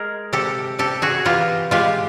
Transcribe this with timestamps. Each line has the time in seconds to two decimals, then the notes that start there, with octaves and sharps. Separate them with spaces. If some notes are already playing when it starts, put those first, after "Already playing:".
Already playing: G#3 G#4 A#4
0.33 C3 G4 A4
0.79 C3 G4 A4
1.02 F#4 G#4
1.25 E3 F4 G4
1.71 G#3 F4 G4